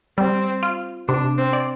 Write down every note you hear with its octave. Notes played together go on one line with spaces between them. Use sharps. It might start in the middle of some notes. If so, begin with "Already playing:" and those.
G3 C4
F4
C3 D4
C4
D5